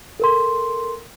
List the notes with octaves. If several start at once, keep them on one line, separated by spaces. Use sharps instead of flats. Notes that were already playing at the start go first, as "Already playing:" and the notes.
A4 A#4 C6